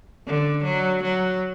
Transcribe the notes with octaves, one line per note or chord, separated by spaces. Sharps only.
D3
F#3
F#3